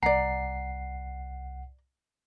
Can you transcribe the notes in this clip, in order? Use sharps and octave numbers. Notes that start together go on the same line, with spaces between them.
C2 D5 F#5 A#5 C7